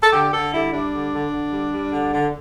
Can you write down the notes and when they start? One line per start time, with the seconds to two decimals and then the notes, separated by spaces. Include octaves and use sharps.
0.03 A4
0.13 D3 G4
0.33 D3 A4
0.53 G3 E4
0.73 G3 D4
0.93 D3
1.13 D3
1.31 D3
1.52 G3
1.72 G3
1.92 D3
2.12 D3